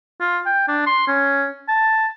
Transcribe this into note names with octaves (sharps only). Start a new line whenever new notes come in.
F4
G5
D4
C6
C#4
A5